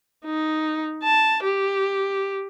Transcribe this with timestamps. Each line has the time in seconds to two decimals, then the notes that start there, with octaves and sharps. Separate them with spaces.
0.25 D#4
1.03 A5
1.43 G4